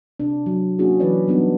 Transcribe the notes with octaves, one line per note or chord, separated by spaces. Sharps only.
C3 D4
F#3
A#3 C#4 D4 E4 F#4 G#4
E3 F#3 C#4 B4 C#5 D5
F#3 G3 B3 D4 D#4